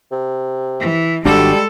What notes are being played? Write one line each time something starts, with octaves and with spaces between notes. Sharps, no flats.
C3
E3
G#1 G3 G#3 D4 F#4 A4